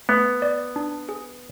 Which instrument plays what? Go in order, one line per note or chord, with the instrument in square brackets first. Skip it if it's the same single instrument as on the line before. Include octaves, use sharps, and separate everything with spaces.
[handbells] A3 [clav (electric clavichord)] B3
[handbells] D5
D4
G#4